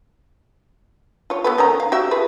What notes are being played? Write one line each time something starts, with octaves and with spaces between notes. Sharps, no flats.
F4 C#5
B3 A4 B4
D#3 C#4 A#5
F5
F#4 G4 E5
F4 G#4 B4